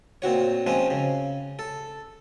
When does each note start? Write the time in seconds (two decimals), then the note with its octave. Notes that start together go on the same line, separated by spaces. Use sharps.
0.22 A#2 C4 F#4 C#5
0.67 F3 G#3 C4 C#4
0.90 C#3
1.59 A4